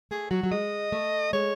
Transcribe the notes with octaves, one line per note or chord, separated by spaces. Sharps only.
A3 G#4
F#3 F#4
F#3
G#3 D#5
A3
G#3 C#5